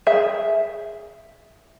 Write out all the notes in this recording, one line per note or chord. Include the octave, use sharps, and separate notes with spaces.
G#4 E5